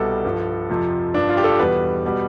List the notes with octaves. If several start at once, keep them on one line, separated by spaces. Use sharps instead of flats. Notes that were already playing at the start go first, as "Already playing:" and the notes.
Already playing: C2 B2 G3 A4
G2 F3
F2 C3 F3
G2 F3 D4
F4
G4
A4
E2 B2 G3 B4
B2 G3